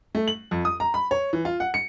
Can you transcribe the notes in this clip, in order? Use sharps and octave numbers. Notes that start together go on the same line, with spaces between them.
A3
F#7
F2
D#6
A#5
B5
C#5
E3
F4
F#5
C#7